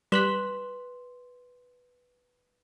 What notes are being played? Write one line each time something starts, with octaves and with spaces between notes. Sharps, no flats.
G3 B4 C6 F#6 B6 E7